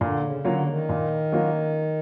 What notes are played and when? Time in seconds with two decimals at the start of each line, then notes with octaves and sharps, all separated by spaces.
0.01 A#2 D3
0.23 C#3
0.45 D3 F#3 A#3 C#4 F4
0.67 D#3
0.89 A#2
1.32 F#3 A#3 C#4 F4